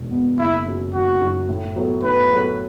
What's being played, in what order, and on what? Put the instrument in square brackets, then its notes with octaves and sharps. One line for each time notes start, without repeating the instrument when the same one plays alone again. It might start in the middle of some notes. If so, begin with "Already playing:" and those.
Already playing: [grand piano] E1 E2 B2 B3
E2 B2 B3
[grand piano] F#1 [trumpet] E4
[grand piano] F#2 F#3
[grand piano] F#1 [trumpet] F#4
[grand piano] F#2 F#3
A2
F#3 B3 A4 C#5
[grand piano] A2 [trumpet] B4
[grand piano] F#3 B3 A4 C#5